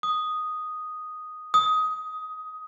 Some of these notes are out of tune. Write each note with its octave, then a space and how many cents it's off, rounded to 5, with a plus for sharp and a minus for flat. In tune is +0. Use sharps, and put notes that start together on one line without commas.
D#6 +0
D#6 +15